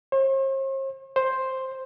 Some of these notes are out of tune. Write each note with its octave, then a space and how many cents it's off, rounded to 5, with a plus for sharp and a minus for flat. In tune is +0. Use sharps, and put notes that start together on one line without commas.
C5 +45
C5 +5